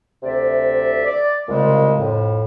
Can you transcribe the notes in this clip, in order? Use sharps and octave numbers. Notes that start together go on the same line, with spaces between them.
D2 C3 D5 E5
D5
C2 A#2 C#3 G#3
F2 A2